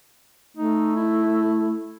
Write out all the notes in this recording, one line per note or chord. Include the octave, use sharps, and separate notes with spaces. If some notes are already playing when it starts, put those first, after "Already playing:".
A3 D#4
E4